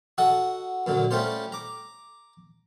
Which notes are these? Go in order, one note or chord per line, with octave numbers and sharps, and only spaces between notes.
F#4 A4 D#5 F#5
F#2 A#2 D3 F#3
G3 A3 C#4 F4 C5
A#5 D6